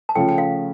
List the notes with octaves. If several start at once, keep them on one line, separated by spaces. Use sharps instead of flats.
A5
C#3 F3 A3 G5
G5
F5